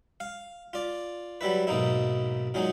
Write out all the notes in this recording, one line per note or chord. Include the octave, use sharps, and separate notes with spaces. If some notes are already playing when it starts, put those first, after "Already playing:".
F5
F4 D5
F#3 G3 E4 B4
B1 G#2 A#3 D#4 E4
A#2 F#3 G#3 D#4